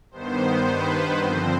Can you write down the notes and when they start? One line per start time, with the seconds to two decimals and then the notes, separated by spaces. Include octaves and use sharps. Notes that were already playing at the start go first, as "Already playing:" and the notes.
0.11 G2 D#3 B3 C5
0.65 B4
1.19 G2 D3 F3 C4 C5